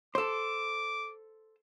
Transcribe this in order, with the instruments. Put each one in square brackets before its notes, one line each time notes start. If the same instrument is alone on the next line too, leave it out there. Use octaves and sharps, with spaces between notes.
[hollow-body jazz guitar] A4 C5 [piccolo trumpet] D6